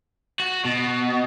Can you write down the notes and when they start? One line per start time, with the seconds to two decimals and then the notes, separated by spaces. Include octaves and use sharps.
0.40 F#4
0.65 B2